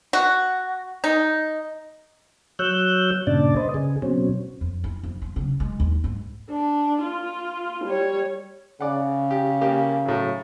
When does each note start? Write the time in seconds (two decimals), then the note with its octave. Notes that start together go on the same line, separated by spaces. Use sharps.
0.13 F#4
1.04 D#4
2.59 F#3 C#5 E6 F#6 G6
3.27 G2 A#2 C#3 D4 D5 A5
3.56 B4 C5 D#5
3.74 C#3 G#4
4.02 B2 F#3 C4 C#4
4.61 F2
4.84 E4
5.03 F2
5.22 F3
5.36 C#3
5.60 G#3
5.80 D#2
6.04 G#2
6.50 D4
7.03 F4
7.84 G3 C#5
8.81 C#3 D5 F#5
9.31 G4
9.61 A#3 G4
10.06 A2 F#3